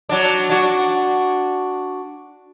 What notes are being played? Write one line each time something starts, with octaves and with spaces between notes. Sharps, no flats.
F#3 D4
D4 F#4